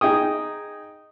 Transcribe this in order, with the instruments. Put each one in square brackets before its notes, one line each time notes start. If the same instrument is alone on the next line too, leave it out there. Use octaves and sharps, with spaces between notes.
[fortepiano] D#4 G#4 G5 D#6